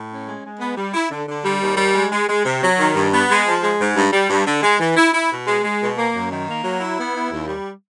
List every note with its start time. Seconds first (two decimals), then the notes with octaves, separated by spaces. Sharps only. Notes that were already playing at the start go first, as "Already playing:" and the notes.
Already playing: A2
0.10 C#4
0.26 G#3
0.43 G#3
0.60 B3
0.77 G3
0.94 E4
1.10 D3
1.27 D3
1.44 G3
1.61 D#2
1.77 G3
1.95 G#3
2.11 G#3
2.29 G#3
2.44 C3
2.62 F#3
2.78 D#3
2.95 G2
3.12 B3
3.29 G#3
3.46 F3
3.62 G#3
3.80 G#2
3.95 G2
4.12 G3
4.29 G2
4.47 D3
4.63 G#3
4.80 E3
4.97 E4
5.13 E4
5.30 B2
5.47 G#3
5.64 G#3
5.81 B2
5.97 A#3
6.15 F#2
6.31 D#3
6.48 A#3
6.64 F#3
6.81 E4
6.98 B3
7.15 E4
7.31 D#2
7.48 G3